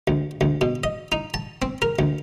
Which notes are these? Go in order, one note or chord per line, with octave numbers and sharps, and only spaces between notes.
D2
D2
B2
D#5
D#4
A5
C4
A#4
D2